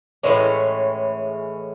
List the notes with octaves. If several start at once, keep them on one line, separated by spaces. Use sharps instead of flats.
A2 E3 G#3 C#4